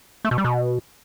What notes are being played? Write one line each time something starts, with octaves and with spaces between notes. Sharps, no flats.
A3
B2
G3
B2